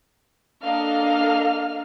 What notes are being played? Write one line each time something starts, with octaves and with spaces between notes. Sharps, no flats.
A#3 D4 A4 D#5 F5 F6